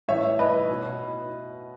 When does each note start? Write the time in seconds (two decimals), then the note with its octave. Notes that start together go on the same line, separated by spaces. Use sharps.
0.08 A2 E3 C#5 E5
0.39 B4 D#5
0.69 B2